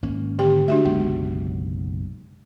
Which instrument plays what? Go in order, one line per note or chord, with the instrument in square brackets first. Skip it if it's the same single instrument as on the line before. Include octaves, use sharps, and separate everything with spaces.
[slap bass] G#1 A#3 C#4
[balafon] D3 G4 G5
[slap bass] A3 [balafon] D4 F#4 E5
[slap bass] F#1 B1 B2 [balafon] G#3